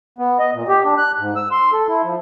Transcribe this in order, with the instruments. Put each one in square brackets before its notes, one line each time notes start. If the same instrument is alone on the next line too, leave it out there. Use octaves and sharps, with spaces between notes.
[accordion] B3
D#5
A#2
G4
D4
F#6
G#2
E6
C6
A4
E4
F3